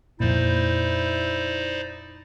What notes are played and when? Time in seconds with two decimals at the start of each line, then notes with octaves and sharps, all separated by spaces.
0.20 F2 A#2 D#4 E4 C5 D5